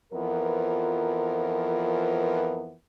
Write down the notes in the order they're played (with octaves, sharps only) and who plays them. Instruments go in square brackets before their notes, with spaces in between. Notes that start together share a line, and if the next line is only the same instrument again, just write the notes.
[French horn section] F2 E3 F3 B3 A#4